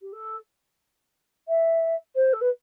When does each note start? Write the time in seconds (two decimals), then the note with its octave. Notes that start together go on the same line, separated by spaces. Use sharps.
0.01 G4
0.12 A4
1.48 E5
2.15 C5
2.33 A4
2.41 B4